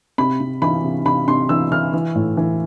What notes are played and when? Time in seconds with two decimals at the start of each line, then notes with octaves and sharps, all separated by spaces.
0.18 C3 B5
0.40 C3
0.62 E3 B5
0.84 C3
1.06 C3 B5
1.28 C3 C6
1.49 E3 E6
1.72 E3 F6
1.94 E3
2.15 A2
2.37 E3